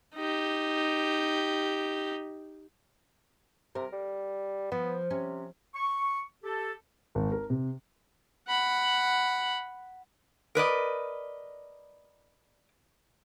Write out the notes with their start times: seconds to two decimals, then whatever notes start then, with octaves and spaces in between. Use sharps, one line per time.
0.17 D#4 G4
3.75 C3 A#4
3.93 G3
4.72 F3 B3
5.10 C3 C#4
5.74 C#6
6.43 G4 A4
7.15 G#1
7.32 A#4
7.50 C3
8.48 F#5 B5
10.55 A#4 B4 D5 D#5